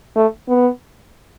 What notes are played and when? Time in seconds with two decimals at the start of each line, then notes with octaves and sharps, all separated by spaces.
0.16 A3
0.48 B3